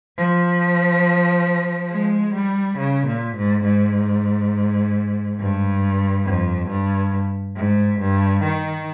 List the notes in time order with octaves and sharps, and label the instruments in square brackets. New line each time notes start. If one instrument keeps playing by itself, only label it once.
[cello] F3
G#3
G3
C#3
A#2
G#2
G#2
G2
F2
G2
G#2
G2
D#3